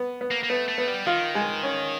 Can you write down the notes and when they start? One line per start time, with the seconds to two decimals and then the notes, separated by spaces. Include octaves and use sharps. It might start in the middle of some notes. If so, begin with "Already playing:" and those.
Already playing: B3
0.21 B3
0.31 A#3
0.43 A#3
0.49 A3 B3
0.68 A3
0.78 B3
0.88 G3
1.06 D#3 F4
1.35 G#3
1.63 C#4